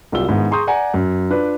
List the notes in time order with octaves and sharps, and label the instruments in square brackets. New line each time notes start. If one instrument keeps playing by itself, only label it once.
[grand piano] C2 F#3 F4 G4 E6 G7
G#2 D#3 B3 D4 E4
G#4 A#5 C6 C#6 D#6 G6
D5 F#5 G#5 A#5
F#2
D4 F4 B4 D5